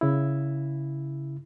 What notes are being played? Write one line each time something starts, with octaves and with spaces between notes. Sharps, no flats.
C#3 E4